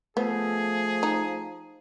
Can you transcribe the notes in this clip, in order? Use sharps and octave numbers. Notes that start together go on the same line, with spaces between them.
F3 A3 B3 G#4
D#4